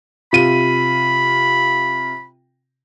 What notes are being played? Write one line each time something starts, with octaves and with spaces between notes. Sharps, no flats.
C3 F4 B5 D#7